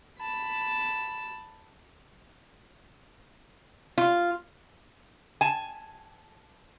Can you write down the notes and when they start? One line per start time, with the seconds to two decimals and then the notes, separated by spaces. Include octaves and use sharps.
0.21 A5 B5
3.98 F4
5.41 G#5 A5